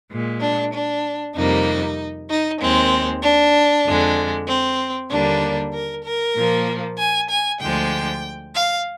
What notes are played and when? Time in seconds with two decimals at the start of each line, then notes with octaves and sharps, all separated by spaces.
0.11 A#2 G#3
0.42 D4
0.73 D4
1.35 F2 C3 G3 A#3 D#4
2.30 D#4
2.60 D#2 D#3 G#3 C4
3.23 D4
3.85 F2 D3 G#3
4.48 C4
5.10 D#2 D3 G3 A#3 D4
5.73 A#4
6.04 A#4
6.35 A#2 F3 A#3
6.99 G#5
7.30 G#5
7.61 D2 D3 F3 G#3 G5
8.54 F5